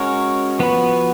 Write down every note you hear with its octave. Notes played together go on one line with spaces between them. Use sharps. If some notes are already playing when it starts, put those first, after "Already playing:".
Already playing: G#3 C#4 F#4 A#4 C#5
F3 B3 F#4 B4